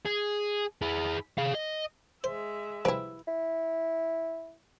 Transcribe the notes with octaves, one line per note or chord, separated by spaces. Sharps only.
G#4
E4 G#4
G#4 F5
D#5
G#3 C5 E5
C3 F3 G3 E4 B4
E4